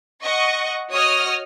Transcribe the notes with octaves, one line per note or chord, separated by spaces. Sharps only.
D#5 F#5 C#6
F#4 C#5 D#5 D#6 F6